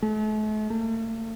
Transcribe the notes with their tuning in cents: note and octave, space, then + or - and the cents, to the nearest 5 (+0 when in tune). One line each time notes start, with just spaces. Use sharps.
A3 -40
A3 +45